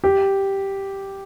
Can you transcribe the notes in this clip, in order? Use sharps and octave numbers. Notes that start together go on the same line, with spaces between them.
G4